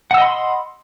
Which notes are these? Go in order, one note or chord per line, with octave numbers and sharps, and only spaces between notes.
D#5 F#5 B5 C6 E6